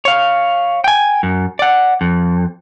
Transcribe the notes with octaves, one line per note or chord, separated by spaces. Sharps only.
C#5 F5
G5 G#5
F#2
D5 F#5
F2